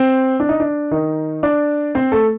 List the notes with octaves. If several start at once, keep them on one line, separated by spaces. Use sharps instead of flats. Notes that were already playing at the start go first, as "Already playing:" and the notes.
Already playing: C4
D4
D#4
D4
D#3 D#4
D4 D5
C4 C5
A3 A4